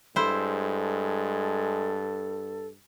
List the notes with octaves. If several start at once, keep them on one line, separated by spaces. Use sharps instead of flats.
G2 G#3 E4 A4 C5